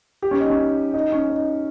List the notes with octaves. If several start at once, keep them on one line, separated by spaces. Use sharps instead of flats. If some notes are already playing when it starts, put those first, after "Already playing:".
G4
C#4
D#4
C#4
D#4
C#4
D#4